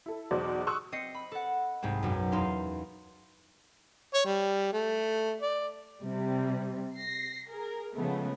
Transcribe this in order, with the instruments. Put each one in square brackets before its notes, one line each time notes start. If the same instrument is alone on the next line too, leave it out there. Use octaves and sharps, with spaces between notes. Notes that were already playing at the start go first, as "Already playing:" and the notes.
[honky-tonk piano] E4 A4
B1 E2 B2 F#3 C5 D5
C6 C#6 D#6 E6 F#6
[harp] C4 D#5 C7 C#7
B5
A4 F#5
C2 G#2 G#3 C4
B1 F#2
E2 D#4 E4 F5 C6
[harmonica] C#5
G3
A3
D5
[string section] C3 G3
A#6 C7
G#4 A#4
C#3 F3 G#3 A3 B3